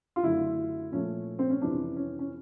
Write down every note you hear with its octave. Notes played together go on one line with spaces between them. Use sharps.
F4
F#2 D3 F#3 A3 E4
A#2 F3 A3 C#4
C4
C#4
F2 C3 E3 G3 D4
C#4
C#4